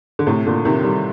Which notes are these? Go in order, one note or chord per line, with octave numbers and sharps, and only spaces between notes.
D3
A2 C3
A#2 D3
C3 D#3
D#3 G3